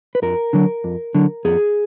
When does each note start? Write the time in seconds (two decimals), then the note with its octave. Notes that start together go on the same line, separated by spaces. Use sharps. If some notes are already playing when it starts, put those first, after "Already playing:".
0.15 B4
0.22 F2 A#4
0.53 D3 F#3
0.84 F2
1.15 D3 F#3
1.45 F2 G#4